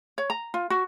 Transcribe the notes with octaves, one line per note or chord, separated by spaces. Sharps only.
C#5
A#5
F4
F#4